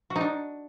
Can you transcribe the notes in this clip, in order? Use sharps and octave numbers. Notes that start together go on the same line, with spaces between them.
F#4
D#4
D4